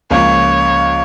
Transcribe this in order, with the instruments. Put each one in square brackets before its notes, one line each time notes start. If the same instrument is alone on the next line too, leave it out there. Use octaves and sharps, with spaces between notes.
[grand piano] C#2 C#3 F3 A#3 F4 [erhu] C#5